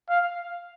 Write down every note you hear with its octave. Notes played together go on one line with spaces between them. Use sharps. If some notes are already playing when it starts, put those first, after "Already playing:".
F5